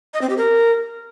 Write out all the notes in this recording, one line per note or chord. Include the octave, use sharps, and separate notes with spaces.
D#5
C4
G4
A#4